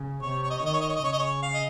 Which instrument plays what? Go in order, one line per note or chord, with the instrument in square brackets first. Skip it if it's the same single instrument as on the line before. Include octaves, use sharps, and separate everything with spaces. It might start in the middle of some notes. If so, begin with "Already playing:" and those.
Already playing: [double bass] C#3
[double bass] C3 [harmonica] C#5
[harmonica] C#5
D#5
C#5
[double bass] D#3 [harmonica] D#5
[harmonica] C#5
D#5
C#5
D#5
[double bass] C#3 [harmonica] C#5
[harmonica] D#5
C#5
F5
D#5